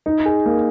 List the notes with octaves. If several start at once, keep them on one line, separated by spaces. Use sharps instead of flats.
D#4
G#4
A#3